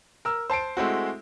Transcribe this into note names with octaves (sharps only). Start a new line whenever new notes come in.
A#4 E6
C5 A5 C7 D7
G#3 A3 C4 E4 F#4